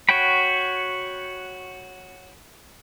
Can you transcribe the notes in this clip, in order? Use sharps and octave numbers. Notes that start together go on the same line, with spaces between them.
F#4 C#5 F#5 G5 B5